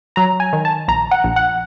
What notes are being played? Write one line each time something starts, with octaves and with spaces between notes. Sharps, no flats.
F#3 A#5
G#5
D#3
A5
A#1 A#5
F#5
A#1
F#5